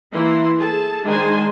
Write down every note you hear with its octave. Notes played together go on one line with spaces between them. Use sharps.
E3 A#3 E4 C6
G#4 A4 A5
D#3 G#3 D4 C5 G#5 C6